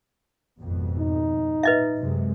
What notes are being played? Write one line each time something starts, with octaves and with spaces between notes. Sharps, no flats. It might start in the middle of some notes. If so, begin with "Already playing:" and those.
G#1 F2 B2
D#4
A#2 B4 D#5 E5
F#2 C3 G#3